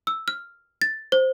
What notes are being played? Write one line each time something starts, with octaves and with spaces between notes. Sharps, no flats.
E6
F6
A6
C5